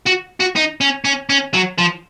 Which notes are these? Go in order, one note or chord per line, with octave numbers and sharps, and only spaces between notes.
F#4
F#4
D#4
C#4
C#4
C#4
F#3
F3